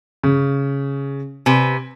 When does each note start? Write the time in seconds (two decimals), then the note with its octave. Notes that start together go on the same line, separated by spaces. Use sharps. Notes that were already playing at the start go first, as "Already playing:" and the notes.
0.23 C#3
1.46 C3 B4 G#5